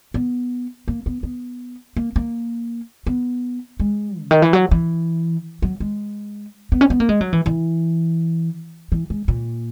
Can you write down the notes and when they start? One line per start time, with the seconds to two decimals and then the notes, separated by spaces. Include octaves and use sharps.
0.14 B3
0.88 A#3
1.06 B3
1.23 B3
1.96 A#3
2.16 A#3
3.06 B3
3.80 G#3
4.20 C#3
4.31 D#3
4.42 E3
4.53 F#3
4.71 E3
5.62 F#3
5.80 G#3
6.72 B3
6.81 C#4
6.90 B3
7.00 A#3
7.09 G#3
7.21 F#3
7.33 E3
7.46 E3
8.92 E3
9.10 G#3
9.28 A#2